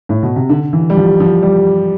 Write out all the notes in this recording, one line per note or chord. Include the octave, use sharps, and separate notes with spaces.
A2
B2
C3
D3
E3
G3
F3
F3
G3